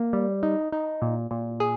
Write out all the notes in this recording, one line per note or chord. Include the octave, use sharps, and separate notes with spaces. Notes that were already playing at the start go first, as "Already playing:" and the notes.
Already playing: A#3
G3
D#4
D#4
A#2
A#2
G#4